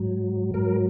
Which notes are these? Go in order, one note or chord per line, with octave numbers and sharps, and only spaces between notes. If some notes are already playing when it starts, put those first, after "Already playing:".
Already playing: G#2 F#3
G#2 F#3 A#4